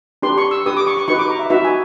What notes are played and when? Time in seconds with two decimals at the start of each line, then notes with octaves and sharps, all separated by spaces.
0.22 D4 G4 B4 C6
0.38 C#6
0.51 E6
0.66 D4 G4 B4 D#6
0.77 D6
0.87 C#6
0.97 C#6
1.08 D#4 F#4 B4 C#6
1.18 D6
1.30 A#5
1.39 E5
1.50 D#4 F#4 B4 E5
1.65 G#5